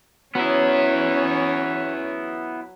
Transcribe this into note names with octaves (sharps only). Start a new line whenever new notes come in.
F#3 B3 C#4 E4 C#5